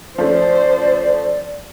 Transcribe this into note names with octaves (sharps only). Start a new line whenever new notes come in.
F3 A3 C#4 C5 D5